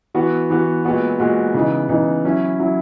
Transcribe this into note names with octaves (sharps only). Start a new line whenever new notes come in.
E3 B3 F#4
E3 B3 F#4
A#2 G#3 B3 F#4
A#2 G#3 B3 F#4
C#3 E3 B3 D#4
C#3 E3 B3 D#4
F#3 C#4 E4
F#3 C#4 E4